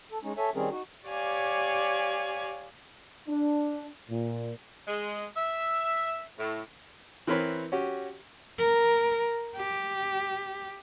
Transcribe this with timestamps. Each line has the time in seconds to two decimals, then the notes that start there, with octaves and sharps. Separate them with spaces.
0.11 A4
0.23 G#3 C#4 D#4
0.37 A4 C#5 E5 G#5
0.55 D#3 G3 C4 C#4 G#4 A#4
0.71 D#4 F#4
1.06 G4 C#5 D5 F5 G#5
3.27 D4
4.10 A#2
4.88 G#3
5.36 E5
6.39 A2
7.27 E3 C4 A#4 B4 C#5 B5
7.72 C#4 F#4 G4
8.59 A#4
9.57 G4